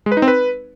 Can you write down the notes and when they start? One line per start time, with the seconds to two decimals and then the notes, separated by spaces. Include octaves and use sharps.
0.06 G#3
0.12 B4
0.17 D#4
0.22 C4
0.28 B4